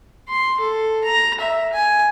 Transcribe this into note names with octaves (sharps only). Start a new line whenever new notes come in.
C6
A4
A#5
E5
G#5